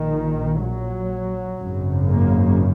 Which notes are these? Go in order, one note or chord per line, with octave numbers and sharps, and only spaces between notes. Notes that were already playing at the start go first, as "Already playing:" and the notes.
Already playing: A#1 A#2 D#3
F#3
G#1 F#2 C#3
A#3